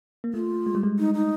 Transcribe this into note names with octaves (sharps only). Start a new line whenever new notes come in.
A#3
A3 F4
G#3
G3
G#3
D#4
D#4